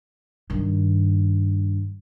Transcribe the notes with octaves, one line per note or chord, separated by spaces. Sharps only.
G2 D#3